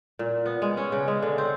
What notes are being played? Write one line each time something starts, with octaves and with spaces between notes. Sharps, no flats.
A#2
B3
G#3
C#4
C#3
G#3
D3
C4